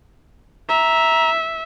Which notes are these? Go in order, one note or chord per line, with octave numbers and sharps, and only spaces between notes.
E5 A#5